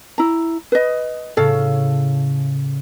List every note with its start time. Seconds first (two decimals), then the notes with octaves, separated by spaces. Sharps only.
0.18 E4 A#5
0.72 B4 D#5
1.37 A2 C#3 A4 C#5 F5